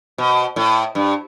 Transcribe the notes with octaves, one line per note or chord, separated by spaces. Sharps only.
B2
A2
G2